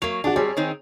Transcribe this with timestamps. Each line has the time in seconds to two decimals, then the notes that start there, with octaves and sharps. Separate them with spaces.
0.02 F#3 A#3 F7
0.24 D4 F#4 G#4
0.36 G#2 G3 C4 G#4 C#5
0.57 D#3 C4 D#4